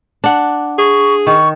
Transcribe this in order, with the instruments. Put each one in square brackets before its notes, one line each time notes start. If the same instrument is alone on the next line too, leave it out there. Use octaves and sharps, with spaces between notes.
[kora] D4 F#5
[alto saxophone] G#4 [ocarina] C#6
[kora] D#3 [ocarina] C#6